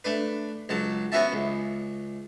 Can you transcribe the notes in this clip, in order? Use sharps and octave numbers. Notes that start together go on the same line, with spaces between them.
A3 D4 B4
C#2 F#3 A5
B3 C#4 E4 F#4 E5 A5
C#2